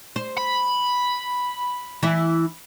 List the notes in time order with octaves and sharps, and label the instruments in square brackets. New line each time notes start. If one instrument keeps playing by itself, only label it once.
[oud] C5
[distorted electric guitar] B5
[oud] E3 E4 E5